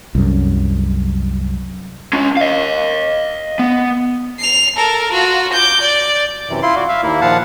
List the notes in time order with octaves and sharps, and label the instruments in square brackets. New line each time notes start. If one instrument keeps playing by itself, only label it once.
[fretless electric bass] C2 F#2
[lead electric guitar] C#4 F4
D#5 F5
B3
[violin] C7 F7
A4 A#4
F4 F#4
D6 G6
D5
[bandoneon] F#2 C3 E3
E4 F4 C6
F#4 D5
E5 F5
D#2 A#3 E4
D#2 A#2 F3 F5 F#5 A5